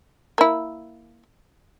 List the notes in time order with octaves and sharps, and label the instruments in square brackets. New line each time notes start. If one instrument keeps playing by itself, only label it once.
[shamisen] A#3 E4